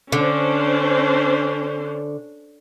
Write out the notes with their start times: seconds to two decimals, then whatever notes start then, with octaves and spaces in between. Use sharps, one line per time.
0.12 D3 C#4 D4 C5